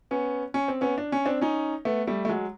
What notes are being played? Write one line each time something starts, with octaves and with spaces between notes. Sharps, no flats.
B3 C#4
C#4
C4
B3 C#4
D4
C#4
C4 D4
C#4 D#4
A3 B3
G3 A3
A3
F#3 G#3